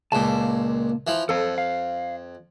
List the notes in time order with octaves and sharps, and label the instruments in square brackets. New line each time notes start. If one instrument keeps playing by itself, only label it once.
[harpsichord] C#2 A#2 [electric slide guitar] A#3 A5
[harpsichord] E3 F3
[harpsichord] F2 [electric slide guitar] A4 F5
[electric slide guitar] F5